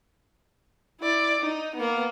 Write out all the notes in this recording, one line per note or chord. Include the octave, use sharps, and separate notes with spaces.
E4 D5
D#4
A#3 B3